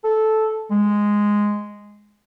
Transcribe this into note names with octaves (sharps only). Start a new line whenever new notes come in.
A4
G#3